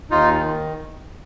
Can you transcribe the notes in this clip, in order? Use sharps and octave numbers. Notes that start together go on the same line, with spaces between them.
D#2 D#4 F4
D#3